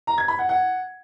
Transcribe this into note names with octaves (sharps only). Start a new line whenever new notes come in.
A#5
G#6
B5
F#5
F#5